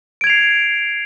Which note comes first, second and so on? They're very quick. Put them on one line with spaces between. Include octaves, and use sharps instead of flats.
D7 G#6 F7 C7